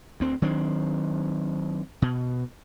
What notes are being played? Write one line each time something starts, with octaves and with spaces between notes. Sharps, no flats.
D2 C4
D#3 F#3 C4 D4
B2